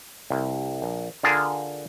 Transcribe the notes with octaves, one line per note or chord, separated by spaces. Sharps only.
C2
A#1
D3 F4 G#4 A#4 A5